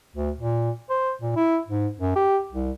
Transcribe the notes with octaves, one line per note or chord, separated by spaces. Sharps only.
D2
A#2
C5
A#2
E4
G#2
F#2
G4
C2